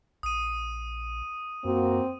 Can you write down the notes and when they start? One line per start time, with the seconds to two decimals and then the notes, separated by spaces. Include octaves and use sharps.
0.23 A#1 D#6 D#7
1.65 F#2 A#3 C4 F#4